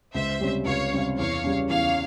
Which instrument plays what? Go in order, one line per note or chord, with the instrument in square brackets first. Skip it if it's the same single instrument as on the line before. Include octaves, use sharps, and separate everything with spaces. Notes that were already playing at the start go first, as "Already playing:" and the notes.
[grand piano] C#2 [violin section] C5 E5
[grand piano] C3 G3 C#4
[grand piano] C#2 [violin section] C#5 F5
[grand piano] C3 G3 C#4
[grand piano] E2 [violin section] C#5 F5
[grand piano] C#3 G3 C#4
[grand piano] E2 [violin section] C#5 F5